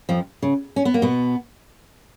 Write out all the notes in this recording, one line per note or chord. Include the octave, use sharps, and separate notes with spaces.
F2 F3
C#3
C#4
B3
A#3
B2 B3